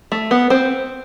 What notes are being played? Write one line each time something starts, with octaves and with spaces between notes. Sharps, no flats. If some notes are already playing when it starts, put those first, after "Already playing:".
A3
B3
C4